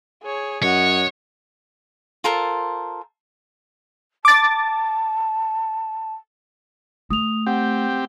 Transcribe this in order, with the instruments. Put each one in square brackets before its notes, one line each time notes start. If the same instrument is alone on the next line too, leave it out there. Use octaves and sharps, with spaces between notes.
[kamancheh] G#4 C#5
[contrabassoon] F#2 [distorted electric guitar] C#5 [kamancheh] D#5 F#5
[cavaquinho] F4 A4 A#4 C5
[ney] A5 [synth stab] D6 A6
[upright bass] A3 [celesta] D#6 F7
[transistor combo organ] C4 G4 [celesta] F#5